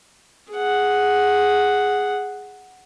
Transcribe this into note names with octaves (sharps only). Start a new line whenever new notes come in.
G#4 F#5